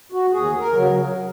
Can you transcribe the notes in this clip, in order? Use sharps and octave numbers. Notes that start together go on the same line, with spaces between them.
F#4
D#2 G#4
A#4
C#3 F#3